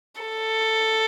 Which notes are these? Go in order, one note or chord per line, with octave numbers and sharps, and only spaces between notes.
A4